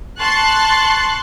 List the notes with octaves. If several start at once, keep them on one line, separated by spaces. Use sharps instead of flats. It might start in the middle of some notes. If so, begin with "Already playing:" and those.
A5 C6 C#6 F#6 A6